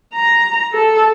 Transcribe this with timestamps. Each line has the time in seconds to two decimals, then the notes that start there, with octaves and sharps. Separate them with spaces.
0.14 A#5
0.74 A4